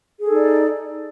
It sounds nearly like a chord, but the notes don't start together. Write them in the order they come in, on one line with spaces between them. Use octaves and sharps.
G#4 A4 D#4 D5